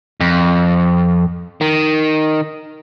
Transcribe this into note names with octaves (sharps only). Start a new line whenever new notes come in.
F2
D#3